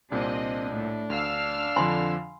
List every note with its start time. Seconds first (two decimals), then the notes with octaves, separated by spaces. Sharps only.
0.12 C2 A#2 C4 D4 D#5
0.72 A2
1.10 D2 F5 E6 F6
1.76 F2 D3 F3 G#5 B5 C6